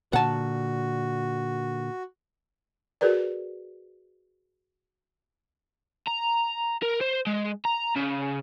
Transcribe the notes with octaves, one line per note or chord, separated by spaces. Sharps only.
A#2 D3 F#4 F#5 A5
F#4 G#4 A#4 B4 D5
A#5
A#4
C5
G#3
A#5
C#3